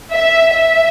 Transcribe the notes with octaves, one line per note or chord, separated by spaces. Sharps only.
E5
E5